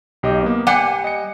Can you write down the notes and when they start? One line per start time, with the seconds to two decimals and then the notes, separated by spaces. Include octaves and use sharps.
0.23 B1 G4 D#5
0.43 A#3 B3
0.67 G3 F#5 G#5 D6 F#6 C#7
1.04 D#5 C#7